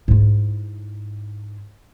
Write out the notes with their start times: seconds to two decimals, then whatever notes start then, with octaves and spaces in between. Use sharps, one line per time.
0.08 G#2 E4